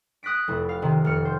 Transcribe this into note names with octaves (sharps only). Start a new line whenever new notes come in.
D#6 F#6 A#6 B6 D7
F1 E4
F5
C3 D#3
F1 F6 C#7
C5